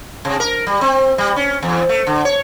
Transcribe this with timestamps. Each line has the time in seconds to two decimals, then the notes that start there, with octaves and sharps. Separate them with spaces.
0.25 C3
0.40 A#4
0.67 G3
0.81 C4
1.18 G3
1.36 C#4
1.63 E2
1.89 A3
2.07 D3
2.25 C#5